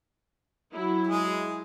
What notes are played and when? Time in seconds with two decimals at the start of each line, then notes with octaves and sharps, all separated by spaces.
0.73 F#3 E4
1.07 G#3 G#4